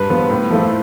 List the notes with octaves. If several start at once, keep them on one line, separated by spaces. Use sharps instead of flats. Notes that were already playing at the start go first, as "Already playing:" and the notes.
Already playing: G2 B4
D3 F3 B3
A2
F3 A3 E4